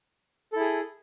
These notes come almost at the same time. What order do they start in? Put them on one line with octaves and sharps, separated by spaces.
A4 E4 G#4